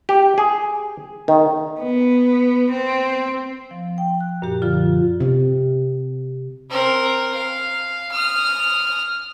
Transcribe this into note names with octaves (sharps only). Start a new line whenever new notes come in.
G4
G#4
D#3
B3
C4
F3
G5
F#6
F#2 A#2 G4
D3 F3 F4
C3
C4 A#4
F5
D#6 F6